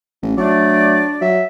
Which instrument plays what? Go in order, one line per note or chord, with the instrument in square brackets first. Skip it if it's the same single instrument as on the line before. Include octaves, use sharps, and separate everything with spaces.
[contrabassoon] A1
[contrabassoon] F#3 [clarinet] A3 [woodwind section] D4 D5
[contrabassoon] F#3 [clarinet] E5